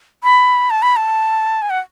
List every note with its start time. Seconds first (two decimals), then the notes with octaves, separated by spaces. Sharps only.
0.24 B5
0.70 A5
0.82 B5
0.96 A5
1.62 G#5
1.70 F#5